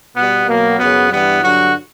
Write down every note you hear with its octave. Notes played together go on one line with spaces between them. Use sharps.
B2 G3 B3
B2 F#3 A#3
F#2 C#3 F#3 B3
G2 E3 G3 B3
G2 D3 F#3 F#4